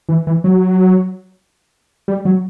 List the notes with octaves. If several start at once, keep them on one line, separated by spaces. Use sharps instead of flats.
E3
E3
F#3
G3
F#3